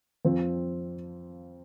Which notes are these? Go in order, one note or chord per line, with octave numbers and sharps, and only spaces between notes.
F2 F3 C4 F4